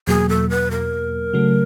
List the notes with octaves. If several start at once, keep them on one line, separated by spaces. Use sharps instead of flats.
E2 B2 F#3 A#3 G#4
A4
B4
A#4
C#3 F#3 A3